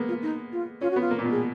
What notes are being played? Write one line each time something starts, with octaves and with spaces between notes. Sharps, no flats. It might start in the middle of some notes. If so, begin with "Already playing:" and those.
Already playing: G#3 A#3 B3
F4
D#4
F4
C#4 F4
F#4
B3 F4
A#3
A#2
B2
G#4